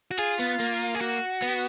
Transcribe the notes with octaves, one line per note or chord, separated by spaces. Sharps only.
F#4
F4 G#4
B3
A#3
G#4
F#4
B3